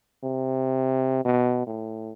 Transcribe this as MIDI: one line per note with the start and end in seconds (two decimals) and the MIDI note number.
0.24 1.20 48
1.25 1.63 47
1.67 2.13 45